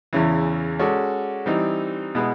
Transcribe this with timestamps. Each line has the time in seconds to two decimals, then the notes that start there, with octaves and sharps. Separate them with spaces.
0.13 E2 C#3 E3
0.79 G#3 C#4 F#4 A4 D5
1.46 E3 G3 C4 D#4
2.15 B2 G#3 B3 E4